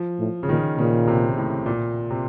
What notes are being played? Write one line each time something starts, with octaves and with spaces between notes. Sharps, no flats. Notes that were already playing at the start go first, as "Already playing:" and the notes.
Already playing: F3
A2
C#3
A#2 D#3
A#2 C#3
C3
A2
A#2
C3